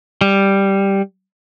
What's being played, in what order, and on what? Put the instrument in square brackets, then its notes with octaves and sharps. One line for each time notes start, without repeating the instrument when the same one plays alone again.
[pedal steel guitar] G3